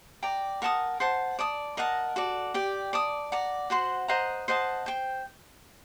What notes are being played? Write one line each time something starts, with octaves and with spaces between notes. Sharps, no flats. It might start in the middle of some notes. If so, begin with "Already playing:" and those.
D5 G5 A#5
A#4 F#5 A5 D#6
C5 F#5 A5
D5 A5 D#6
A#4 D#5 F#5 A5
F#4 A4 D5
G4 D5 G5
D5 A5 D#6
D5 F#5 A#5
F#4 C5 F#5 C6
C5 D#5 F#5 A#5
C5 D#5 F#5 A5
C5 G5